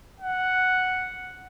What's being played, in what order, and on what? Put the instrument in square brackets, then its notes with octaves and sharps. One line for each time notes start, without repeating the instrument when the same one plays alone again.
[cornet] F#5